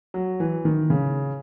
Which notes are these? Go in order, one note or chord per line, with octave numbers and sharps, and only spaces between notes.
F#3
E3
D#3
C#3